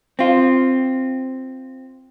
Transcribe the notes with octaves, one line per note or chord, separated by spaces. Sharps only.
C4 F4